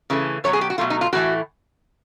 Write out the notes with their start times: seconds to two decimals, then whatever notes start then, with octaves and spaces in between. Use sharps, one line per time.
0.10 C#3 E3 A3
0.44 B2 F#3 A3 C#5
0.53 G#4
0.61 G4
0.70 F#4
0.78 B2 F#3 A3 F4
0.90 D#4
1.01 F4
1.13 A2 E3 A3 F#4